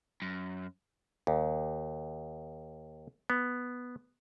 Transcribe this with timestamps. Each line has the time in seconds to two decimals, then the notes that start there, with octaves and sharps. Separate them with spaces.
0.22 F#2
1.27 D#2
3.30 B3